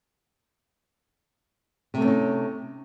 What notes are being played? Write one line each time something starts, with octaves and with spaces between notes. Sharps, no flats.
C3 A3 A#3 C#4 D#4